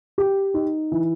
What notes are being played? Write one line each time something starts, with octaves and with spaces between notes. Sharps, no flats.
G4
D#4
E3